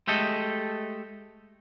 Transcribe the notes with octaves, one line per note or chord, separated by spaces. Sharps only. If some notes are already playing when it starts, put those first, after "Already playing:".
G#3 A3 G4 A4 D#5